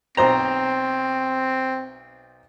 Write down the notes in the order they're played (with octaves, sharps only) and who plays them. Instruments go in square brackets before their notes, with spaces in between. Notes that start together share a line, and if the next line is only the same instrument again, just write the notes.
[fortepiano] B1 C5 A#5 [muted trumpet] C4